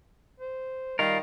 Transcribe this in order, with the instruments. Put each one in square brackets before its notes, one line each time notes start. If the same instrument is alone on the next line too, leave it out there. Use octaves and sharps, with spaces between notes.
[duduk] C5
[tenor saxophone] D#3 [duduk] G3 [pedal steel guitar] F4 A#4